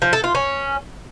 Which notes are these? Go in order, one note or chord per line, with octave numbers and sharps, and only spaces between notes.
F3
A4
F4
C#4